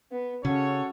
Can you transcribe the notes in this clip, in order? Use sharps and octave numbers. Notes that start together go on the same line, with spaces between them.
B3
C#3 C#4 F#4 A4 C#5